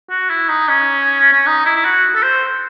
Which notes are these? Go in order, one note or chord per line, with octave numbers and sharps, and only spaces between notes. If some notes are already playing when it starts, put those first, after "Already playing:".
F#4
E4
D#4
C#4
C#4
D#4
E4
E4
F#4
A4
C5